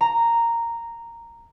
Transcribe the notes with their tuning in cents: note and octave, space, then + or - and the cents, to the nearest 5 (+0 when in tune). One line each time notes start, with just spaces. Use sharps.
A#5 -5